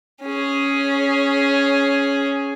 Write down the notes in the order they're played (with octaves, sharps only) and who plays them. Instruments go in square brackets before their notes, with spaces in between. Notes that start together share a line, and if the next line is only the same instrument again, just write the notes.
[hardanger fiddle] C#4 G#4